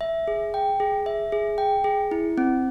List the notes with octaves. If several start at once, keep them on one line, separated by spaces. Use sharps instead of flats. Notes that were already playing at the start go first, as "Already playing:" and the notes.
E5
G#4
G5
G#4
E5
G#4
G5
G#4
E4
C4